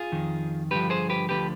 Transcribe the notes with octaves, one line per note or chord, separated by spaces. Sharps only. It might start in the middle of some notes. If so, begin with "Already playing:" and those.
Already playing: F4 G#4
F2 D#3
G2 D3 F3 G4 B4
G#4 C5
G4 B4
D2 D3 F3 G4 B4